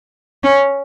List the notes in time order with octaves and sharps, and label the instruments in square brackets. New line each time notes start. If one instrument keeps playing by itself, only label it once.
[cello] C#4